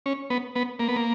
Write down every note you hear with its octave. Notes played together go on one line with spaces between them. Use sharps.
C#4
B3
B3
A#3
B3
A#3